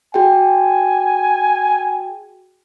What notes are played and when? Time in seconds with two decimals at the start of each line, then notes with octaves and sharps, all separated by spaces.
0.14 F#4 G#4 G5 G#5